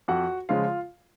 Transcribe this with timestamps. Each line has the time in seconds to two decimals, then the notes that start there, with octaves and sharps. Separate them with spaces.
0.08 F2 F#4 F#5
0.49 C#3 F3 G#3 F4 F5